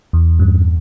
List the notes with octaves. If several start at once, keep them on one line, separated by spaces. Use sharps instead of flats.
E2
G2